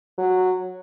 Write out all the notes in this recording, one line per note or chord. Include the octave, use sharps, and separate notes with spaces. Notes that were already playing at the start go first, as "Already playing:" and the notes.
F#3